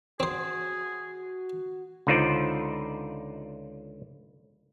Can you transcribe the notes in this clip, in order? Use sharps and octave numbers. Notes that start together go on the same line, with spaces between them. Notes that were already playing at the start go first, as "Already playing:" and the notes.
C4 F#4 G#4 C5
C#2 D3 D#4 F4 C5 D5